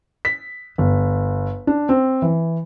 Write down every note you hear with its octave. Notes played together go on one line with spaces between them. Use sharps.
B6
G1
D4
C4
E3